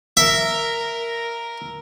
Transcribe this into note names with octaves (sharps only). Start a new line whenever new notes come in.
A#4 E5